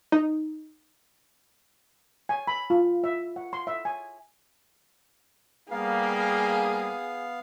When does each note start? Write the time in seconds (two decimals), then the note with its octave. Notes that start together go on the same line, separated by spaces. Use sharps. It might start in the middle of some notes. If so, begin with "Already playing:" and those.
0.12 D#4
2.29 G#5
2.47 B5
2.70 F4
3.04 E5
3.36 F#5
3.53 C6
3.67 E5
3.85 G#5
5.71 G3 A#3 B3 G#4 F5